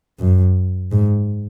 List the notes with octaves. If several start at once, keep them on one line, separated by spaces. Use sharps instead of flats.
F#2
G#2